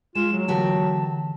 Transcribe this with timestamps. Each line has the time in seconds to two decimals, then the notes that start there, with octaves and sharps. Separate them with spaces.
0.15 G#3 F4 E7
0.32 F#3
0.48 D3 E3 A#3 F#4 G4 A5